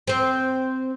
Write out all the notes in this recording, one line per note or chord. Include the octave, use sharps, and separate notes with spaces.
C4 C5